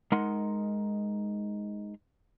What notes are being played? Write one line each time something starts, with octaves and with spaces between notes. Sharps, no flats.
G#3 D#4 A#4 F#5 C6